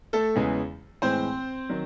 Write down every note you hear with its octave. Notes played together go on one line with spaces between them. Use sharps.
A3 A4
E2 C#3 E3 G#3
A2 E3 G#3 C4 C5
D#3 F#3